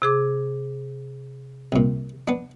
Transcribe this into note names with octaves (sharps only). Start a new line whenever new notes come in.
C3 G#4 D6
C2 A#2
B3 D4